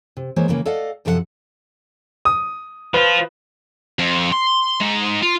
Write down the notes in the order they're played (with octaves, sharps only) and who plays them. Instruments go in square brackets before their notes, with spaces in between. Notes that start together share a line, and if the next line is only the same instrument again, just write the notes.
[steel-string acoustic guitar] C3
E3 G#3 A#3 C5 C#5
D#2 C#3 E3 A#3 C#4
A4 D5 D#5 F5 F#5
F#2 C3 F3 A4 B4 F#5
[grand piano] D#6
[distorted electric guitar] F3 F4 [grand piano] B4
[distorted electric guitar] F2
C6
G#3 D#4
F4